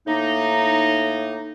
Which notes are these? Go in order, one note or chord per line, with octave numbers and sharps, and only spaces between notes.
A2 A#3 D#4